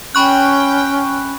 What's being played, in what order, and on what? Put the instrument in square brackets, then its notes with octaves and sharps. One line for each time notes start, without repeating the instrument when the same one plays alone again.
[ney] C#4 [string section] G5 [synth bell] B5 C#6 F#6